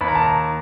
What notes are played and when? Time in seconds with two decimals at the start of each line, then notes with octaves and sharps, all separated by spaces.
0.01 D#2 B5
0.08 A#5
0.15 A5
0.23 A#5